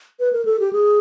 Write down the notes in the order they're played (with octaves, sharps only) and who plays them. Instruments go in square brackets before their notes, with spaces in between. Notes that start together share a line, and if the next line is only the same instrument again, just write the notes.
[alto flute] B4
A#4
A4
G4
G#4